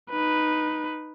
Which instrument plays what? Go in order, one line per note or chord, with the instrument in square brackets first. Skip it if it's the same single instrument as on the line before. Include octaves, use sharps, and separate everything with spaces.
[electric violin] D#4 B4